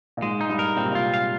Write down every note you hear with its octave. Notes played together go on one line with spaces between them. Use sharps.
A#2
G#2 G#3
D#4
G2
A#4
A#2 C4
C3
A#2 F4
F5